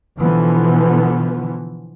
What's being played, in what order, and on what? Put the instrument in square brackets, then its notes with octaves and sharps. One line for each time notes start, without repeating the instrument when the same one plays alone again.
[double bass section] B2 D3 E3 F3 B3